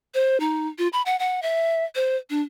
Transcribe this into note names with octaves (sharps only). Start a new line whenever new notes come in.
C5
D#4
F4
B5
F#5
F#5
E5
C5
D4